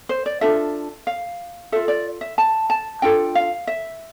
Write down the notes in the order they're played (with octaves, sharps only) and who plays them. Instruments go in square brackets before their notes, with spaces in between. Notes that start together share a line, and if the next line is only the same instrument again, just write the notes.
[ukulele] C5
D5
D4 F4 A4 E5
F5
F4 A4 E5
D5
E5
A5
A5
D4 F4 A4 G5
F5
E5